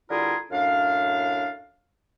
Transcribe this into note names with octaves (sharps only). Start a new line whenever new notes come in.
D3 G3 E4 F4 G#4 A#4
F#2 A2 D4 F5